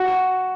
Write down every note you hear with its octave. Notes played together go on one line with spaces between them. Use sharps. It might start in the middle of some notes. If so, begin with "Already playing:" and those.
Already playing: F#4